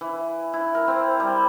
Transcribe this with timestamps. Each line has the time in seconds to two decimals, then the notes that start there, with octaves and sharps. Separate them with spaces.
0.01 E3
0.53 E4
0.75 A#4
0.88 C4
1.20 G3